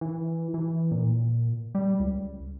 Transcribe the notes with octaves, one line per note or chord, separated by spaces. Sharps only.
E3
E3
A#2
G3
C#2